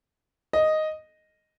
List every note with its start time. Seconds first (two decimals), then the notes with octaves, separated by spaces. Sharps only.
0.53 D#5